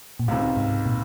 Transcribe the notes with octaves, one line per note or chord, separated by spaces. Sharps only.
A#2
C#2 A2 C3 D#3
G#2
A#2